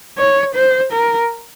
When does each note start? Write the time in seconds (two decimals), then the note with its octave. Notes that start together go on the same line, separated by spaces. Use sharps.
0.18 C#5
0.55 C5
0.92 A#4